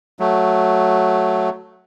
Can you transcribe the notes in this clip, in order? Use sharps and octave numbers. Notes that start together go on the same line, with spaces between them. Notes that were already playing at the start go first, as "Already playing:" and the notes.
F#3 A3